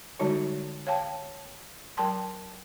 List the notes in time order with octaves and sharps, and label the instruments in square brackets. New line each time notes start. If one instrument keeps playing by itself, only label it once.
[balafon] D3 G3 G#3 D#4 F#4 C#5
C#5 F5 G5 A5
F#3 A#4 G5 A5 C6